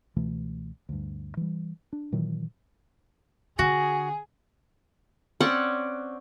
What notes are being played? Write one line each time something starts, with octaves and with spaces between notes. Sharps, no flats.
C#2 B2 E3 A3
D2 G2
E3 G3
D4
A#2 D#3 E3 F#3
D3 F#4 G#4
C4 C#4 D5 F#5